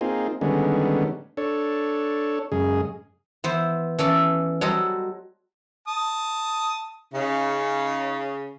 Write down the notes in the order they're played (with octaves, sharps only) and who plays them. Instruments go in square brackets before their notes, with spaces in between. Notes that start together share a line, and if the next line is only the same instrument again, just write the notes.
[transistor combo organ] A#3 C4 D#4 F4 G#4
D3 D#3 G3 G#3 B3 C#4
D4 A4 C#5
F#2 C#3 G#3 G#4
[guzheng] E3 B3 C5
E3 C#4 A4 D5
F#3 G3 A4 C5 D#5
[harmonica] A5 D#6
[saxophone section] C#3 [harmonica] D#4